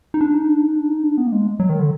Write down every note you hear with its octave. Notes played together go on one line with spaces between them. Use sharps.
D#4
D4
D#4
D4
D#4
D4
D#4
D4
B3
A#3
G#3
F#3
D#3
D3